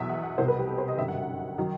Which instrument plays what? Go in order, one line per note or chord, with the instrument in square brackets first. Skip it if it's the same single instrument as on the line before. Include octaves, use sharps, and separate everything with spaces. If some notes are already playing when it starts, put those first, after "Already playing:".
Already playing: [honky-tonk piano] E2 B2 F#3 E5
F#5
F#5
C2 B2 G3 C5
B4
G4
A4
C5
D#5
G1 F#2 D#3 G3 E5
F#5
D#3 F#3